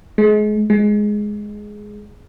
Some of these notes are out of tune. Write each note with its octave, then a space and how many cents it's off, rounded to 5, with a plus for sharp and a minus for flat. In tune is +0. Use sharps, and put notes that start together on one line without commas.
G#3 +30
G#3 +5